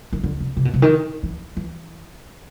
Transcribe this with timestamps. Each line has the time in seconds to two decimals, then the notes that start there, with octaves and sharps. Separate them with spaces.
0.13 D#3
0.23 D3
0.40 C3
0.57 C3
0.65 B2
0.74 C3
0.82 D#3
1.23 E3
1.57 E3